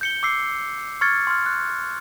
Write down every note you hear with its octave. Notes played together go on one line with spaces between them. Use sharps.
G6 C#7 G7
D6 E6 C7
C#6 F6 G#6 A6 C#7
C6 F6
F#6